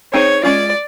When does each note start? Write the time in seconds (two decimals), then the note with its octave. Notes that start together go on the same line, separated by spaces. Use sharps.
0.13 C4 D#4 G#4 C5 C#5
0.43 G#3 C#4 F4 D5